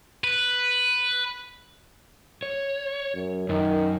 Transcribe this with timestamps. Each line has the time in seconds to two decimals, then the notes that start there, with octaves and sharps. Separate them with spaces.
0.24 B4
2.43 C#5
3.14 F#2
3.49 F#2 D#3